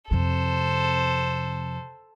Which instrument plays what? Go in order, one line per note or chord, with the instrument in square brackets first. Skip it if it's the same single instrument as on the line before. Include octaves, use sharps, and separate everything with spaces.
[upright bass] F2 C3 [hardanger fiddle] A4 C5